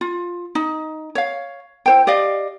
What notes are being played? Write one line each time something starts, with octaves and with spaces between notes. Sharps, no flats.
F4
D#4
C#5 F5
E4 C5 G5
G4 D5 D#5 F5